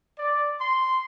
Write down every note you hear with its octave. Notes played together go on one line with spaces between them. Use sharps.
D5
C6